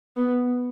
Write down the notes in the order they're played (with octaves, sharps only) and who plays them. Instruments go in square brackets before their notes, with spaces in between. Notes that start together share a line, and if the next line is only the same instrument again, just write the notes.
[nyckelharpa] B3